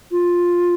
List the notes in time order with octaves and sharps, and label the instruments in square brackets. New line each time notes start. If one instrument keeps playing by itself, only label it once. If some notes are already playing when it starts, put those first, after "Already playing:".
[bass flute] F4